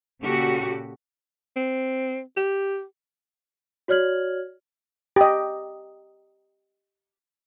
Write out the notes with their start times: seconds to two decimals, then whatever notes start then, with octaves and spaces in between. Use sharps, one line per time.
0.21 A#2 C#3 F#4 G4 A4
1.56 C4
2.37 G4
3.88 F#4 C#5 D5 F6 G#6 F#7
5.16 G4 D#5